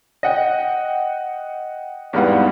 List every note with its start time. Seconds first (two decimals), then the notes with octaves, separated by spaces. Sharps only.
0.23 D#5 F#5 G5
2.13 E2 G#2 G3 B3 F5 F#5